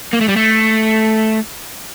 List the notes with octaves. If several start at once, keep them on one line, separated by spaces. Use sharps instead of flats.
A#3
A3
G3
A3